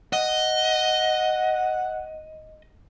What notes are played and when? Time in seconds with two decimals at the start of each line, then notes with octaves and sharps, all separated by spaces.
0.13 D#5 F#5